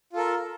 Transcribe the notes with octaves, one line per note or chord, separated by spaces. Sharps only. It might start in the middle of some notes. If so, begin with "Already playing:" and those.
F4 A4 A#4